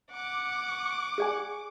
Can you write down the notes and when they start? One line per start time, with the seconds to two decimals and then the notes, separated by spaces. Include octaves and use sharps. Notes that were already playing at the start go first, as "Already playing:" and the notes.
0.13 F#5 D6
1.18 G#4 D5 G#5